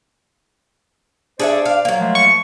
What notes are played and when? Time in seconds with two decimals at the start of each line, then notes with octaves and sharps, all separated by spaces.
1.39 D4 G#4 A4 C5 D5 E5
1.66 F5
1.85 F#3 A#3
1.99 F3 G#3 A3
2.15 C#6